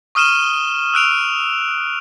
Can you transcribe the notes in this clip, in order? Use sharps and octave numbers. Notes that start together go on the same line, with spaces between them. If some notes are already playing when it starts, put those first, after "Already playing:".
C#6 D#6 F6 D#7 E7 G7
E6 F#6 D7 F7